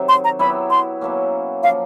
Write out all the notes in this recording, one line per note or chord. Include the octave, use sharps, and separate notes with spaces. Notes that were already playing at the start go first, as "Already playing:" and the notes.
Already playing: C3 D#3 F#3 C4
C6
A#5
F#3 B3 E4 G4 B5
C6
B2 F#3 A#3 C#4
F3 A#3 C#4 F4 F5